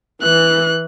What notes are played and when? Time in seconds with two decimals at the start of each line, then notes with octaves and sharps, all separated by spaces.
0.22 E3 F#6